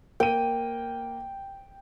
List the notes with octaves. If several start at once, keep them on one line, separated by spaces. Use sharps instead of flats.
A#3 G5 D#7